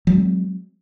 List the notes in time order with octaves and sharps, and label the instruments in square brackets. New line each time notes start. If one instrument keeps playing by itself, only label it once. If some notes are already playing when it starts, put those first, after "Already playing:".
[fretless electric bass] F#3
G#3
C4